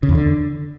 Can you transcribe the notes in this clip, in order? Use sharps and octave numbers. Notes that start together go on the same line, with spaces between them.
C#3
E2
D3